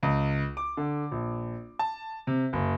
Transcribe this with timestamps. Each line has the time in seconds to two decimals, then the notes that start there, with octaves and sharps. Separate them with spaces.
0.03 C#2
0.57 D6
0.77 D3
1.11 A#1
1.79 A5
2.27 C3
2.53 F#1